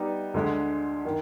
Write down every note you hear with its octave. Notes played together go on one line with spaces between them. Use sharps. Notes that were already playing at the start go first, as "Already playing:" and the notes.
Already playing: G3 B3 D#4
D2 D3 G#3
D#3